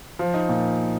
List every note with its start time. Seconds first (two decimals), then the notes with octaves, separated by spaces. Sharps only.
0.19 F3
0.34 D#4
0.49 A#2